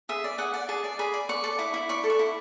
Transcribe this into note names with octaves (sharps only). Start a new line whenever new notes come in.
G#4 E5
D5
G#4 F#5
D5
G#4 A5
D5
G#4 B5
D5
D5 C#6
A4
E4 D6
E4
D5 C#6
A4
C#6
E4